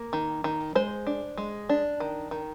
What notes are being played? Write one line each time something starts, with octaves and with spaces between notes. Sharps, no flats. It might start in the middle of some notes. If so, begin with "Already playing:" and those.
Already playing: A#3
D#3
D#3
G#3 C5
D4
G#3
D4
D#3
D#3